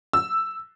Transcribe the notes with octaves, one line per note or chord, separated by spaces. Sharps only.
E6